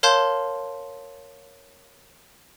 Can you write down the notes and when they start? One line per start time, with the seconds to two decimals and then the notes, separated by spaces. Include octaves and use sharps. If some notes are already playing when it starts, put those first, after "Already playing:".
0.03 A#4 C#5 F5 A5 C6 G6